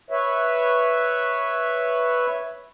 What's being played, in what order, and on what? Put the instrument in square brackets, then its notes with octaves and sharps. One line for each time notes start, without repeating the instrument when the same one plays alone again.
[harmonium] B4 C#5 E5